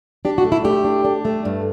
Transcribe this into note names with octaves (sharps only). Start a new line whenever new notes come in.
D4 G4
F#4
A3
E4
A3 G4
D4
D4
A3
G2